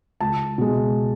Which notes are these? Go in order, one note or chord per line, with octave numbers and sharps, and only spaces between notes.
C#2 A5
B2 G#3